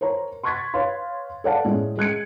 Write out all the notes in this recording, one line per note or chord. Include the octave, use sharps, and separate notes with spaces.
A#4 C5 C#5 A#5
C6 C#6 F#6 G#6 A6 B6
B4 C#5 F5 C6
A4 B4 D5 F5 F#5 A5
A2 G#3 A3 C#4
G#3 F#6 G#6 C#7